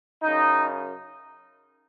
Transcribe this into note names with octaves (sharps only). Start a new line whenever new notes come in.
F#2 C#3 D#4